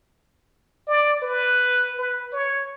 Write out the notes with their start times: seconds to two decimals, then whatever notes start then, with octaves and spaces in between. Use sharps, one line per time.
0.87 D5
1.22 B4
1.99 B4
2.33 C#5